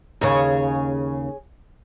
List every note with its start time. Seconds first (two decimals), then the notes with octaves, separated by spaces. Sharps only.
0.21 D#2 C#3 G#4 C#5